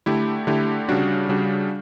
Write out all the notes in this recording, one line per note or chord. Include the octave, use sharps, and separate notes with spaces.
D3 A3 E4 G4
D3 A3 E4 G4
C#3 G3 D4 F#4
C#3 G3 D4 F#4